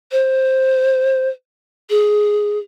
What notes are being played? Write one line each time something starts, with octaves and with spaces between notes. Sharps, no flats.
C5
G#4